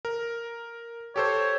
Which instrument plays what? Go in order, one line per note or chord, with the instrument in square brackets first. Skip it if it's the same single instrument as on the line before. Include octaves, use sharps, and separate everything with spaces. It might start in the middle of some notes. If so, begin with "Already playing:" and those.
[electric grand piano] A#4
[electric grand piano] G4 A4 C5 [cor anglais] C#5